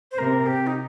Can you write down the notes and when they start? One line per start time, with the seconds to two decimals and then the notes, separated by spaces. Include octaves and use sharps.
0.12 C5
0.18 C3 A#4
0.46 G4
0.67 D#4